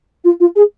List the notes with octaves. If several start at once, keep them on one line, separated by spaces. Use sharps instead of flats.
F4
F4
G#4